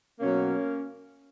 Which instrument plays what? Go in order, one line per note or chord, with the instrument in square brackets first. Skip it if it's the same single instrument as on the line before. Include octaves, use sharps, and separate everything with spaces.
[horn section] B2 F#3 A#3 C#4